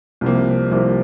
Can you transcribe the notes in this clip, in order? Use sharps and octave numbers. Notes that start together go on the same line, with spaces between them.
C2 C3 F3 A#3
C2 C3 F3 A#3